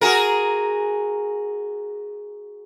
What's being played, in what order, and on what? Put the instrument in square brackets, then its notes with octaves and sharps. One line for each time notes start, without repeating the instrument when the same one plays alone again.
[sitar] F#4 G#4 A#4